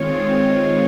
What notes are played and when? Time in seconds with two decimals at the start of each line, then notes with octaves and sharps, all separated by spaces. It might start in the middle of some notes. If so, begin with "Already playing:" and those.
Already playing: D#3 G#3 C4 F4 C#5